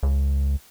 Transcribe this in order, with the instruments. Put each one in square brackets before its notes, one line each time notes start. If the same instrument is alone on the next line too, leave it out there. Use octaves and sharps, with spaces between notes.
[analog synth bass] C#2